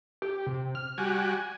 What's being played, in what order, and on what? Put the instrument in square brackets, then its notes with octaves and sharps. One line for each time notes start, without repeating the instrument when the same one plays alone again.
[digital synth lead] G4
C3
F6
[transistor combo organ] G3 F#4 [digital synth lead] G#5